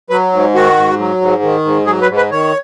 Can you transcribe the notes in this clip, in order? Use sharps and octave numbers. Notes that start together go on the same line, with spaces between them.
F#3 B4
G#2
D#3 F#4
G#2
F#3
G#2
D#3
G#2
F#3 G#4
B4
G#2
B4
D#3 C#5